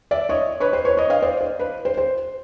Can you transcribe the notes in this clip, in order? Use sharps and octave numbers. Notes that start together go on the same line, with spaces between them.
D5 E5
C#5 D#5
B4 C#5
C5
B4 C#5
C#5 D#5
D#5 F5
C5 D5
C5
B4
C5
C5